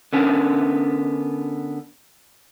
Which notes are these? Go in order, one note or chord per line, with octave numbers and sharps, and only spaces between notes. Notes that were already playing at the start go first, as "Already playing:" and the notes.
D3 B3 C#4 D4 A#4